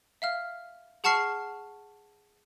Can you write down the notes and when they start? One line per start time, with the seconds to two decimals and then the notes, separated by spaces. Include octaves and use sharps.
0.22 E5 F5 F6
1.04 G#4 F#5 A5 C#6 F6 C7